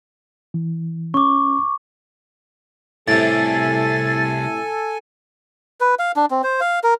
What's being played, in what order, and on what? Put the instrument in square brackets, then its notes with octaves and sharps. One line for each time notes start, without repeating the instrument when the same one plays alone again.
[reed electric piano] E3
[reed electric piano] C#4 [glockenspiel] C#6 D6
[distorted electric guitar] C2 G4 [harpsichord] A2 C3 [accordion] A4 G#5 [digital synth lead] A6
[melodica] B4
F5
D4
C4
C5
F5
A#4